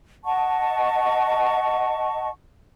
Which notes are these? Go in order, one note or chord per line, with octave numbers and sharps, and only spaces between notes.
D#5 F#5 A5 C#6